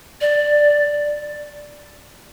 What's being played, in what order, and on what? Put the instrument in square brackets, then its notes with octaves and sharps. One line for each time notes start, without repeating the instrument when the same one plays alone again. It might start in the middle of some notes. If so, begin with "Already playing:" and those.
[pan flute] D5